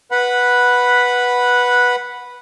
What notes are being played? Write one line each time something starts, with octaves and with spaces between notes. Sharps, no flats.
B4 F#5 B5